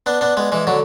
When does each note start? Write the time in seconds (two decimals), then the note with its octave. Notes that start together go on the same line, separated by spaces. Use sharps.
0.06 B3 D4
0.21 B3 D4
0.37 G#3 B3
0.52 E3 G#3
0.67 D3 F#3